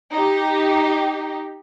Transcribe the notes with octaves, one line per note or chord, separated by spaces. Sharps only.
D#4 G4